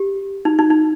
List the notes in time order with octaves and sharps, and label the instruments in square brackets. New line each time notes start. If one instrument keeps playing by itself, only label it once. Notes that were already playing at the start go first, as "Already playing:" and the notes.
Already playing: [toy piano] G4
D#4
D#4
D#4